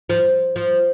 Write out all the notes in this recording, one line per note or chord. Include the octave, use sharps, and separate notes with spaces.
F3
F3